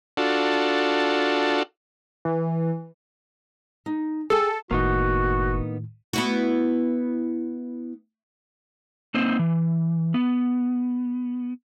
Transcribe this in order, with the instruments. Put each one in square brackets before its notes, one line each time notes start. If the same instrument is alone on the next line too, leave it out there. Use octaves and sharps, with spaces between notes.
[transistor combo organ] D4 F4 F#4 A4
[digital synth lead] E3
[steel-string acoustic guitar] D#4
[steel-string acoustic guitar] G#4 G5 G#5 [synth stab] A4
[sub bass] F#1 [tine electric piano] A2 D#3 [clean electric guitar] A#3 B3 D#4 [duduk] F#4
[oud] B3 E4 F#4
[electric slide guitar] A#3 C4 D#4 C5
E3
B3